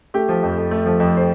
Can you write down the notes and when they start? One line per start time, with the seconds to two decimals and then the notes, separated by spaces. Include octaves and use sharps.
0.14 A3 G4
0.29 F3
0.43 F2
0.58 F2
0.71 A3
0.86 F3
1.00 F2
1.17 C5